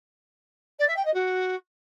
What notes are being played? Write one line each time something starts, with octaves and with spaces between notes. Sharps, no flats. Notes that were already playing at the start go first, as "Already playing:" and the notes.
D5
E5
G5
D#5
F#4